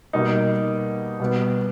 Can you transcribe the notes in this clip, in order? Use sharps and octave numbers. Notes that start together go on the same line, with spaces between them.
B2 G3 A#3 D#4
B2 G3 B3